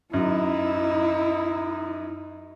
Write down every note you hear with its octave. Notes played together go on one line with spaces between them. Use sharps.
F#2 D#4 E4